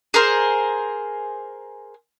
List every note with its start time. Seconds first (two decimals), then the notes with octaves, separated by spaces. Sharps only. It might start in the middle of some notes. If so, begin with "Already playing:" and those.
0.14 G#4 A#4 C5